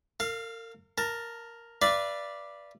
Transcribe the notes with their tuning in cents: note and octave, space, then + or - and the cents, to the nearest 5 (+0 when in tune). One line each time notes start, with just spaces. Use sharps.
A#4 -40 F5 +0
A#4 +0 A5 +25
B4 -15 D5 +0 F5 -40